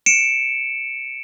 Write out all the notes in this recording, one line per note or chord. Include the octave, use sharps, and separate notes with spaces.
C#7 D7 E7